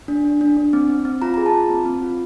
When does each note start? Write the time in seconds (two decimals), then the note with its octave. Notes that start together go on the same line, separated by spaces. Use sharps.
0.08 D4
0.25 D4
0.41 D4
0.57 D4
0.73 C4
0.90 C4
1.05 C4
1.22 F4 A#5
1.34 G#4 A#5
1.46 A5
1.54 F4
1.70 C4
1.86 C4
2.02 F4